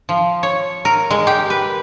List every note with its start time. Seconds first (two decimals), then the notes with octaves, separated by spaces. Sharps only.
0.09 F3
0.43 C#5
0.85 A#4
1.11 G#3
1.27 G4
1.50 B4